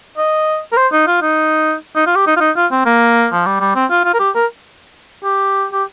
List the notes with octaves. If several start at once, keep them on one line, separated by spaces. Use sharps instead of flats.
D#5
A#4
C5
D#4
F4
D#4
D#4
F4
G4
D#4
F4
D#4
F4
C4
A#3
F3
G3
G3
C4
F4
F4
A#4
G4
A#4
G4
G4